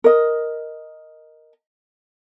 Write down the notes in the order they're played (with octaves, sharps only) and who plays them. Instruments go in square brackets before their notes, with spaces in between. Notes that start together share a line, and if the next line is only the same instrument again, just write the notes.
[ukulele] A#4 D#5